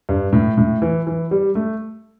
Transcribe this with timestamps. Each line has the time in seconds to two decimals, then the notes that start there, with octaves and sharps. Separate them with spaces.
0.09 G2
0.33 A2
0.57 A2
0.82 E3
1.07 E3
1.31 G3
1.55 A3